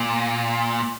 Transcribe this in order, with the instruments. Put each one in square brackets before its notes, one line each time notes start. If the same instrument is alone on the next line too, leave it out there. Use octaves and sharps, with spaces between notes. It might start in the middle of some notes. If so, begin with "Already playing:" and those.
Already playing: [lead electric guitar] A#2